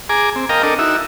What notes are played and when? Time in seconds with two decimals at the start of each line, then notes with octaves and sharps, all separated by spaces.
0.09 G#4 G#5 A#5 D6
0.36 C4
0.49 A#4 D#5 F5 G5 A#5
0.63 D4 A4 A#4 D#5
0.79 D#4 E4 F#4 E5